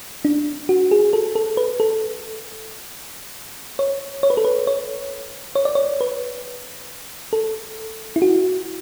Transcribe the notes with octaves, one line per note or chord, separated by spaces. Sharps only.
D4
F#4
G#4
A4
A4
B4
A4
C#5
C#5
B4
A4
B4
C#5
C#5
D5
C#5
B4
A4
E4
F#4